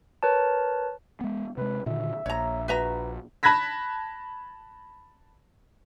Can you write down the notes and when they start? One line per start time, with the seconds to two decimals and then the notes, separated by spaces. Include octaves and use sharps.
0.23 A#4 B4 C#5 A5
1.21 G#3 B3
1.57 C3 G#3 B4
1.86 A#2 D3 D#3 E5
2.26 A#1 C#5 A#5
2.68 F#4 B4 E5 A#5
3.43 A5 B5 F#6 G#6 A#6 B6